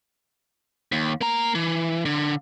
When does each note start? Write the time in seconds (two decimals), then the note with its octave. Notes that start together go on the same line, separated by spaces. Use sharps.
0.92 D#2
1.21 A#3 A#5
1.55 E3
2.05 D3